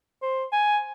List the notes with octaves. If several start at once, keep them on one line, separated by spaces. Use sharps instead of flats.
C5
G#5